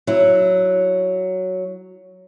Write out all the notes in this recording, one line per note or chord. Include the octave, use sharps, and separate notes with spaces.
F#3 E4